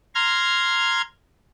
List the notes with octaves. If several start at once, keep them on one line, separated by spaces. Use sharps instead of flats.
A#5 C6 F6 G#6